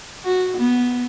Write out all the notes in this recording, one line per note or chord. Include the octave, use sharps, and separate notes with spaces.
F#4
B3